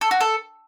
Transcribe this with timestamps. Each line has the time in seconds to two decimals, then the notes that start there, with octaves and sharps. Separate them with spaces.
0.01 A4
0.11 F#4
0.21 A4